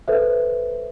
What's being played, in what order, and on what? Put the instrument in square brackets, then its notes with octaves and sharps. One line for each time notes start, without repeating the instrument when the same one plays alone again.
[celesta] A4 B4 C5 E5